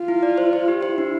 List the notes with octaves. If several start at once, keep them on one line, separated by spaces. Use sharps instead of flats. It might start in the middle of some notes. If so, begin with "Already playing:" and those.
Already playing: F4
E4
D5
C5
C5
G4
E4 C5
D4